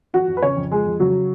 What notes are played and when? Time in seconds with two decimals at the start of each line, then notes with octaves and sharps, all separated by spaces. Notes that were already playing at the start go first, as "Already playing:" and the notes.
0.13 F3 F#4 F#5
0.28 F2
0.37 B4
0.43 C#3 C#4 C#5
0.56 F2
0.71 F3 G#3 G#4
0.85 F2
1.00 C#3 F#3 F#4